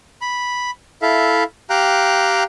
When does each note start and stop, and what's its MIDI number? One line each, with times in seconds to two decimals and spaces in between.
0.21 0.71 83
1.02 1.44 64
1.02 1.44 69
1.02 1.44 76
1.02 1.44 77
1.70 2.44 67
1.70 2.44 77
1.70 2.44 79
1.70 2.44 82
1.70 2.44 90